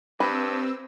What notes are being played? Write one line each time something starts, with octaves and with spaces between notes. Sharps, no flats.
G2 C4 B4 E6